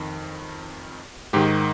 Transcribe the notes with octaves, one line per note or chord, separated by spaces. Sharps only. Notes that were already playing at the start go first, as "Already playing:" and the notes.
Already playing: F2 D#3
G#2 D#3 G4